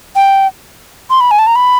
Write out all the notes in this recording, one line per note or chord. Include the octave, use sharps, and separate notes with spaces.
G5
C6
B5
G#5
A5
A#5
B5